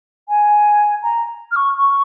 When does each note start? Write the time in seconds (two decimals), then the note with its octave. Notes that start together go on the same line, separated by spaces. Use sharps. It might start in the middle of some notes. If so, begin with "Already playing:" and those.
0.29 G#5
1.03 A#5
1.51 F6
1.56 C#6
1.77 C#6